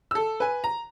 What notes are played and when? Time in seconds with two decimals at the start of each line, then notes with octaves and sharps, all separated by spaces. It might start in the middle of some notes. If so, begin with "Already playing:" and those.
0.11 A4 E6
0.40 B4 G#5
0.64 A#5